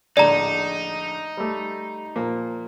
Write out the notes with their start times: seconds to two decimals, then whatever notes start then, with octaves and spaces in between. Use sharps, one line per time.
0.17 A#1 A2 D3 D#4 D5 A#5
1.37 G3 A3
2.16 A#2 F3 A#3